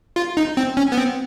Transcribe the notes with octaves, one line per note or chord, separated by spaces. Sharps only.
F4
D#4
C4
C#4
B3
C4